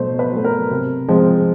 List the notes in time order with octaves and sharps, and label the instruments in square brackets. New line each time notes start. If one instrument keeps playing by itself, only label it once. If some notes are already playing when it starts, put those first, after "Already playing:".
Already playing: [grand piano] B2 F#3 A3 C5
B4
F#3 A3
A#4
C3
F3 G#3 C4